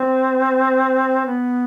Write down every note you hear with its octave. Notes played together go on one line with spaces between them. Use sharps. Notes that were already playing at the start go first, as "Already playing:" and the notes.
Already playing: C4
B3